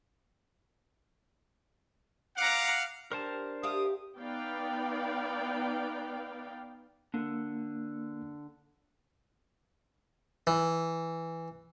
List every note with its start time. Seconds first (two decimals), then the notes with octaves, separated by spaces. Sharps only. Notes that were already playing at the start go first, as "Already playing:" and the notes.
2.37 F5 F#5 A#5 D6
3.12 D4 G4 A#4 C5 A5
3.63 G4 E5 F5 D#6
4.19 B3 D#4 B4 D5 F5 G5
7.14 D3 A#3
10.47 E3